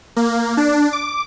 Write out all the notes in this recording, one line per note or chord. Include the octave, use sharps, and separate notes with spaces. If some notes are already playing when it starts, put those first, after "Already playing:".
A#3
D4
D6